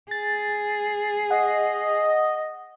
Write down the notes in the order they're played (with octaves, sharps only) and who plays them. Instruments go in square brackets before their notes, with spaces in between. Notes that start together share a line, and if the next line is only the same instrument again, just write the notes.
[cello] G#4 [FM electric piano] A6
[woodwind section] D#5 [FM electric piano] F#5